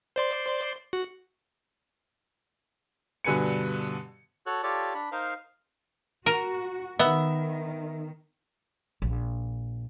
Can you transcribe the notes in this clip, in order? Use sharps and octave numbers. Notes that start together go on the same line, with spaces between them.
C5 D5 C6
F#4
G2 B2 D3 B4 G#5 C#7
F#4 A4 C#5 F#6
F4 G4 A4 C#5 D5
D4 B5
D#4 A#4 C5 F5
F#4 A#4
D#3 B3 E5
A#1